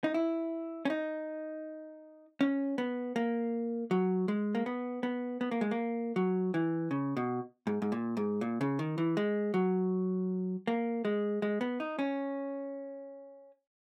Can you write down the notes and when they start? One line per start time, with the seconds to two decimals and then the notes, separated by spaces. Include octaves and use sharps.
0.04 D#4
0.14 E4
0.85 C#4
0.90 D#4
2.41 C#4
2.78 B3
3.16 A#3
3.91 F#3
4.28 G#3
4.55 A#3
4.66 B3
5.03 B3
5.41 B3
5.51 A#3
5.61 G#3
5.71 A#3
6.16 F#3
6.54 E3
6.91 C#3
7.17 B2
7.67 G#2
7.82 G#2
7.92 A#2
8.17 G#2
8.41 A#2
8.61 C#3
8.79 D#3
8.98 E3
9.17 G#3
9.54 F#3
10.67 A#3
11.05 G#3
11.42 G#3
11.61 B3
11.80 D#4
11.99 C#4